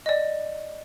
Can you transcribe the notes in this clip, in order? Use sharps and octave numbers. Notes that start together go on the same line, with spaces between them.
D5 D#5